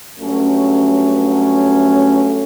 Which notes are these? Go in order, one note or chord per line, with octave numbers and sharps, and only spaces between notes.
G2 F#3 A3 C#4